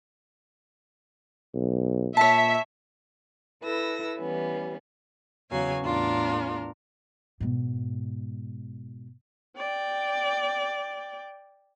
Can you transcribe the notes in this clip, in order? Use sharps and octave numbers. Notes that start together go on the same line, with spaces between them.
B1
A#2 C#5 E5 A5
E4 A4 B4 E6 A#6
E3 G3 B3 C#4
E2 C#3 F#3 F5 G#5
E2 A2 D4 F4 A#4
G#2 B2
D5 G5